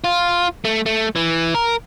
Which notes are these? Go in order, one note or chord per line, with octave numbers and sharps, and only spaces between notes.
F4
A3
A3
E3
A#4